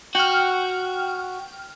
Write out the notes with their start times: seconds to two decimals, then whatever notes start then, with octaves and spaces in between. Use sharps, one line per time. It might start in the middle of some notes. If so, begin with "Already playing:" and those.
0.15 F#4 G5 F6